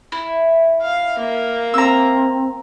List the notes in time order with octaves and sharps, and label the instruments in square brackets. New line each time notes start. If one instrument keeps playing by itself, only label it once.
[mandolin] E4
[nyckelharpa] F5
A#3
[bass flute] C4 [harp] A#5 E6